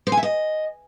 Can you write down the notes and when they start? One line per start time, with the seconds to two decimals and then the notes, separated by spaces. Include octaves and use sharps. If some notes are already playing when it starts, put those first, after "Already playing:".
0.07 C5
0.12 G#5
0.17 E5
0.23 D#5